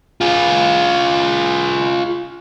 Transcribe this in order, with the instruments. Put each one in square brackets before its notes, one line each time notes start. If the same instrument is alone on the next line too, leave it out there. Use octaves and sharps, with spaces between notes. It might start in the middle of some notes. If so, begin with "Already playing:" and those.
[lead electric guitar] F4 G#4